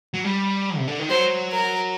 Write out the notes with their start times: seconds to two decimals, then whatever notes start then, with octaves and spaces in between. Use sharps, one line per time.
0.14 F#3
0.24 G3
0.78 C3
0.88 D3
0.99 D#3
1.09 F#3 C5
1.52 A#4